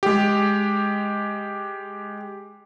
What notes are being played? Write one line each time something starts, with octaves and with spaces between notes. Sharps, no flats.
G#3 G4